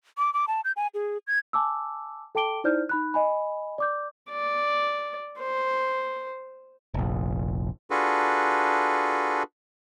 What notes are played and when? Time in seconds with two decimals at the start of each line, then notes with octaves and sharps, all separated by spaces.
0.18 D6
0.34 D6
0.48 A5
0.64 G6
0.77 G#5
0.94 G#4
1.27 G#6
1.53 G#5 A5 D6 E6
2.35 A4 G5 A5 D6 D7 G7
2.64 D#4 E4 C5 D5 F6 G6
2.89 D#4 B5 F#6
3.14 D#5 G#5 B5
3.78 D5 D6 G6
4.31 D5
5.39 C5
6.94 F1 A#1
7.91 D4 F4 F#4 G#4 A4 B4